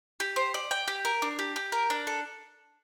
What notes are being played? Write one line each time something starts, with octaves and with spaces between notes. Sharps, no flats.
G4
C5
D5
G5
G4
A#4
D4
G4
G4
A#4
D4
A4